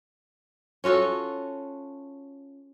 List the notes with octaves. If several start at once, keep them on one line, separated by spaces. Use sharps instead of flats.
C#4 F4 F#4 A4